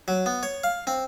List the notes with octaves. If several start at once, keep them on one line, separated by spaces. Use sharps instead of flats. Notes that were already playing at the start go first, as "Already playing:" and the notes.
F#3
B3
C#5
F5
C4